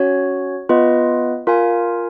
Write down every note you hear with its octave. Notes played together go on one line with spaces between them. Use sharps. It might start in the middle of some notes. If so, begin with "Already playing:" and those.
Already playing: C#4 F#4 C#5
B3 F4 B4 D#5
F4 A#4 F5 G#5